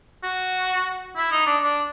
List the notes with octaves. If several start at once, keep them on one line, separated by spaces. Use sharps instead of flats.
F#4
E4
D#4
D4
D4